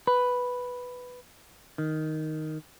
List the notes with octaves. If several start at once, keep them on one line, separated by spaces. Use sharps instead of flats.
B4
D#3